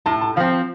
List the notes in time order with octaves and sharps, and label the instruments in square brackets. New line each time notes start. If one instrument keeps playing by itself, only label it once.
[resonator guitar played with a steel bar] A2 [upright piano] A5
[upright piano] A5
[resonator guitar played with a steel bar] F3 C4 [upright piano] F5